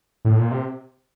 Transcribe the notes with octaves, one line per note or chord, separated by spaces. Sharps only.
A2
A#2
C3